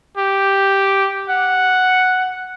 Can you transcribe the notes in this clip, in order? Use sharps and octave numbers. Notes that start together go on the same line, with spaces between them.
G4
F#5